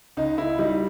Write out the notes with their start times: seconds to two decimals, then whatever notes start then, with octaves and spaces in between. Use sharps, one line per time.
0.17 C#2 D#4
0.38 E4
0.59 G3 D#4